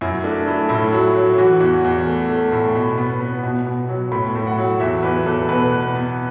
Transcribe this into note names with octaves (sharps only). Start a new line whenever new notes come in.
F#2 E4
A3 D4
A3 E4
A2 E4
F#3
F#3
E3 F#4
E2
E2
A3
A3
A2
B2
B3
B3
B2
B2
F#3
A2 B5
A2
F#5
F#3
E2 E5
E2 B4
E2 A4
B2 B4
B2
B3